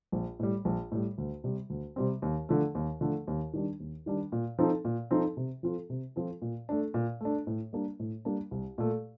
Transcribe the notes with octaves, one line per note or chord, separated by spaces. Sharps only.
A#1
A2 G3
A#1
A2 G3
D2
C3 G3 C4
D2
C3 G3 C4
D#2
D3 F3 A3
D#2
D3 F3 A3
D#2
D#3 G3 D4
D#2
D#3 G3 D4
A#2
F3 C4 D#4 A4
A#2
F3 C4 D#4 A4
C3
F3 C4 F4 A4
C3
F3 C4 F4 A4
A#2
A3 D4
A#2
A3 D4
A2
G3 A#3 D4
A2
G3 A#3 D4
C2
A#2 A3